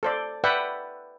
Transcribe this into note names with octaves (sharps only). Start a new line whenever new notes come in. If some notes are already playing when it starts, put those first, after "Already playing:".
A4 C5 D5
B4 D5 E5 F#5 G5